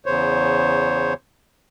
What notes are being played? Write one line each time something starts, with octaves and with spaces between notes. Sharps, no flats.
E2 C#3 C5 C#5